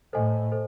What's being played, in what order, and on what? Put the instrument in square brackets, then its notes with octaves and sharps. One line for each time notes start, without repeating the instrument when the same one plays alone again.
[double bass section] A2 [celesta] A4 C5 D#5 G#5
[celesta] A4 C5